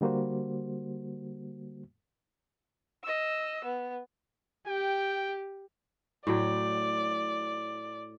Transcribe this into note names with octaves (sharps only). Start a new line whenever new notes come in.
D3 G3 A#3 F#4 C5
D#5 E6
B3
G4 G5
A2 F#3 D5 G5